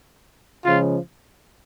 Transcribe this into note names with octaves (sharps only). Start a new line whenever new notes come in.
C#3 F3 G#3 F4